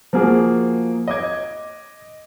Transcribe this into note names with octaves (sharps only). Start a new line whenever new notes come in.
F3 A#3 F#4 G#4
D#5 D6 G#6